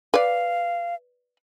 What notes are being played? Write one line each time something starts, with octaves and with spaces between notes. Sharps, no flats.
B4 D5 F5